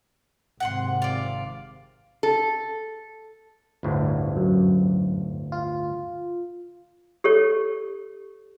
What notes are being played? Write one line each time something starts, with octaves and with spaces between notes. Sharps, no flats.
G#1 C3 F#5 G5 C6
F4 D5
A4
G1 D2 A2
F#2
F4
G4 A4 C#5